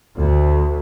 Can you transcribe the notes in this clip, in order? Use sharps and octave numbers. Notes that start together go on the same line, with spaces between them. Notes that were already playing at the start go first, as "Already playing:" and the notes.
D2